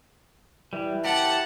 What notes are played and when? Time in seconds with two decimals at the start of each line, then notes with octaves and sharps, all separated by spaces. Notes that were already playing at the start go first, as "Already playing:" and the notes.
0.73 E3 G3
1.05 G4 F#5 A5